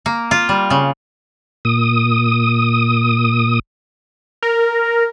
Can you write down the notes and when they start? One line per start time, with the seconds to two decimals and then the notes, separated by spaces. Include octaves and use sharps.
0.06 A#3
0.31 F4
0.49 G3
0.70 C#3
1.65 A#2 D#6
4.43 A#4